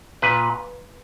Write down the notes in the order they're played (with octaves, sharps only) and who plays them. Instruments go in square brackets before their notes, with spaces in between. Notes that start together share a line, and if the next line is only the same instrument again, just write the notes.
[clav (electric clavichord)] A#2 B4